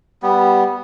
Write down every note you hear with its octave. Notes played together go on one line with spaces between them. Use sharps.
G3 B3